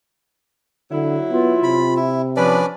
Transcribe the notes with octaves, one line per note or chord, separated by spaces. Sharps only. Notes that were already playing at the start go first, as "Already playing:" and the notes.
D3 F#3 E4
B3 F4
C3 B5
E4
F3 C#4 D4 B4 D5